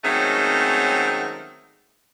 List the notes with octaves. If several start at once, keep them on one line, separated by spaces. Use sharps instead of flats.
D#3 F#3 G#3 A3 C4 C#4